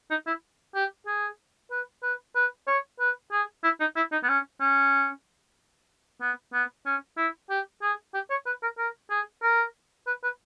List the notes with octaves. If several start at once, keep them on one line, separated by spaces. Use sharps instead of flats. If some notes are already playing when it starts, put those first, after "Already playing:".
D#4
E4
G4
G#4
B4
B4
B4
C#5
B4
G#4
E4
D#4
E4
D#4
B3
C#4
C#4
B3
B3
C#4
E4
G4
G#4
G4
C#5
B4
A#4
A#4
G#4
A#4
B4
B4